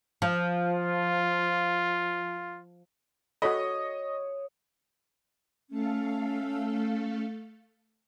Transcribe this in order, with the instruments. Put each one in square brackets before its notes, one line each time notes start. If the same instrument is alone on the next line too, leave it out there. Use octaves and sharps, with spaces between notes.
[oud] F3
[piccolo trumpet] F4
[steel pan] F#4 A4 B5 [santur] C#5 D#6 [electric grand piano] D#5
[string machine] A3 A4 F5 [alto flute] C#4